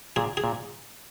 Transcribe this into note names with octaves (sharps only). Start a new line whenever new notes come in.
A#2 G#4
G#4
A#2